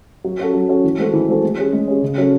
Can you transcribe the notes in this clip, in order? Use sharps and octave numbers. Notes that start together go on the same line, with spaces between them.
F#3
C#4 F#4 A4
F#3
C#4 F#4 A4
E3
G#3 C4 F#4 A4
E3
G#3 C4 F#4 A4
G#3
C#4 G#4
G#3
C#4 G#4
C#3
F#3 C#4 F#4 A4